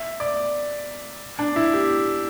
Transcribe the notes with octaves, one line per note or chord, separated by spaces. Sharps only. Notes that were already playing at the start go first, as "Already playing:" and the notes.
Already playing: E5
D5
D4
E4
G4